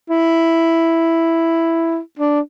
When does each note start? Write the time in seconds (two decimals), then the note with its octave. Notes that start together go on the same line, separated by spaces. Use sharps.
0.10 E4
2.19 D4